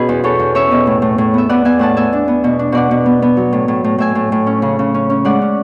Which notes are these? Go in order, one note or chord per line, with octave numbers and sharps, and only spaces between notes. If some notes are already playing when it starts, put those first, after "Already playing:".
Already playing: B2 C#4 F#4 G#4 B4
E2
E2 A4 C#5
E2
C#4 C#5 E5
B2
A2
A2
A2
B3 E5
B3 D5 F#5
B3 E5 G#5
A2 F#5 A5
B3 E5 G#5
D4
B3
B2
D4
B2 D5 F#5
B2
B3
B3
F#3
A2
A2
A2
A2 E5 G#5
A2
A2
C#4
C#3
C#3
C#4
C#4
G#3 D5 F#5
C#4